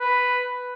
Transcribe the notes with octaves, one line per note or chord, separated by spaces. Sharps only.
B4